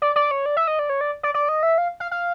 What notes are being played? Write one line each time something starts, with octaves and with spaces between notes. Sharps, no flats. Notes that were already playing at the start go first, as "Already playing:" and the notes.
D5
D5
C#5
D5
E5
D#5
D5
C#5
D5
D5
D5
D#5
E5
F5
F5
F5